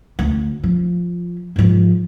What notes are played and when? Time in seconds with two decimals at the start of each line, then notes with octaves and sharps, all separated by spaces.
0.19 D2
0.64 F3
1.56 G#2 F3